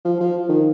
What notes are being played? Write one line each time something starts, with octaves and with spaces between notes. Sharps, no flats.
F3
F3
D#3